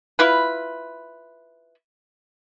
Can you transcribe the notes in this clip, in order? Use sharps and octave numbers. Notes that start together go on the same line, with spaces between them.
E4 F4 B4